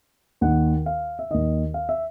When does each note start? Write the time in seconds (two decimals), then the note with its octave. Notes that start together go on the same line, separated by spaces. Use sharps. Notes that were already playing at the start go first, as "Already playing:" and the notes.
0.41 D#2 D#3 F#5
0.86 F5
1.19 E5
1.30 D#2 D#3 D#5
1.74 F5
1.89 E5